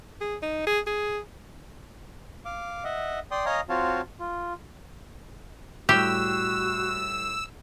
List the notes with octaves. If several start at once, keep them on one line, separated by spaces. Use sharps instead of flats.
G#4
D#4
G#4
G#4
F5 D6
D#5 E5 F#5
D5 G5 C6 D#6
C#5 D#5 F5 G#5 A#5 D#6
C4 F4 F#4 C#5 F5 A5
F4
A2 G3 F#4 G4 E6